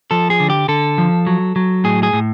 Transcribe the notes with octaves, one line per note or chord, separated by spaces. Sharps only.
F3 A4
G#4
D3
G4
D3 A4
F3
F#3
F#3
A2 G#4
G#4
A2